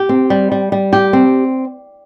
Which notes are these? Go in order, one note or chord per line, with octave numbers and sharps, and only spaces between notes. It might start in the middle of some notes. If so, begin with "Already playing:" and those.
Already playing: G4
C4
G3
G3
G3
G4
C4